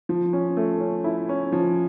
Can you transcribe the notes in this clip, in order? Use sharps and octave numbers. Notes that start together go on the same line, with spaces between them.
F3
C#4
A3
C#4
E4
C#4
F3